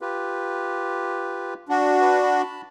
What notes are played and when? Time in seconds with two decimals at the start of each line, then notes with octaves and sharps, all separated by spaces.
0.01 F4 G4 B4
1.69 D4 F#4
2.01 B4
2.23 A5 B5